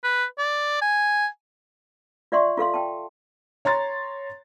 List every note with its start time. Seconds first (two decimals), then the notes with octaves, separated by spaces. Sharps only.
0.04 B4
0.38 D5
0.82 G#5
2.32 F4 D5 E5 F#5 C6 C#6
2.57 F4 A4 F5 C6
2.74 G5 A5
3.65 C#5 A#5 C6 A6